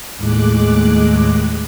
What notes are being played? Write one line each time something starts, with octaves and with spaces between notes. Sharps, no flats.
D#2 A2 G#3 D6 F#6